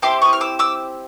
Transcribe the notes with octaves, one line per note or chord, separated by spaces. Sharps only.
C4 E4 G4 C6 D6
C#6 D#6
F6
D6 E6
D6 E6